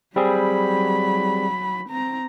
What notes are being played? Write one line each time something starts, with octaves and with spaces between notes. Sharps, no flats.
F#3 G3 C4 G#4 B5
C4 A#5